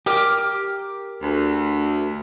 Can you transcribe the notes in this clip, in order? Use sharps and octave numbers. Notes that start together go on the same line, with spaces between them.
G4 A#4 D6 F6
D2